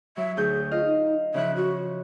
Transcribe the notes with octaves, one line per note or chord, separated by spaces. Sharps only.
F#3 E5
D2 G#4 G6
F4 D#5 F5
D#4
C#3 F3 E5 F#6
F#4